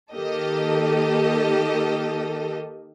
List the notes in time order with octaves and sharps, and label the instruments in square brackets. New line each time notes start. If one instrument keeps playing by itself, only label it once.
[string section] D#3 A#3 G4 A4 D#5